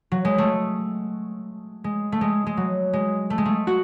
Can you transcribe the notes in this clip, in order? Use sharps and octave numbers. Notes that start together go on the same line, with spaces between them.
F#3
G#3
A3
G#3
A3
G#3
G#3
F#3
G#3
A3
G#3
A3
F#4